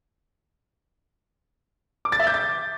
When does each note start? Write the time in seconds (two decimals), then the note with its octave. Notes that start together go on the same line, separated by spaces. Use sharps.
2.05 D6
2.12 A6
2.20 E5
2.27 G6
2.34 A6